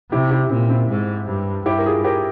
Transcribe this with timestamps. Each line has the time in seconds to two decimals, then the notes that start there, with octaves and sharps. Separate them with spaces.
0.11 C3 E4 G4
0.31 E4 G4
0.50 A#2 C4 E4
0.69 C4 E4
0.89 G#2
1.28 G2
1.66 G2 E4 G4
1.79 A#4
1.86 F4 G#4
2.04 G4 A#4